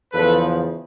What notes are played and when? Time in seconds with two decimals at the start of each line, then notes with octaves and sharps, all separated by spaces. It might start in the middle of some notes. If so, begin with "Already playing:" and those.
0.12 E2 C#3 F3 A4 B4